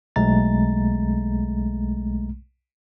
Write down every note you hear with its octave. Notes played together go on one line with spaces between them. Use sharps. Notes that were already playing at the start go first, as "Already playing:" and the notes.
B1 G#3 A3 A#5 A6